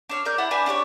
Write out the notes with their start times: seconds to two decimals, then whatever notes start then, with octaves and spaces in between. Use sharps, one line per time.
0.09 D4 C#5 F6
0.25 A#4 D5 G6
0.38 E4 F#5 A5
0.51 D4 B4 G#5 A5
0.66 D4 G4 B4 C#5